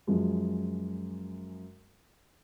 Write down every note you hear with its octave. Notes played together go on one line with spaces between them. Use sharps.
F#2 F3 G#3